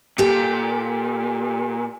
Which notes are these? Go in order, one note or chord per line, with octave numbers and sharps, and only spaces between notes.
A#2 G4 A4